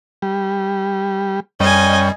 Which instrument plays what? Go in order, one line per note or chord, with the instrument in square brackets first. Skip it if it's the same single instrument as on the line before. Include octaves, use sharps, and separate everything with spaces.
[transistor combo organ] G3
[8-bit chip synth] F#2 G3 [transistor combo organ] C#4 G5 [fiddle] D#5 G#5